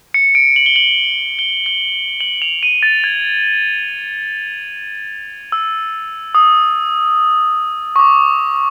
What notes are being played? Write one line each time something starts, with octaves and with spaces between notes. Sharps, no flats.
C#7
D7
F#7
G7
F#7
G7
G7
F#7
F7
D#7
A6
G#6
E6
D#6
C#6
D6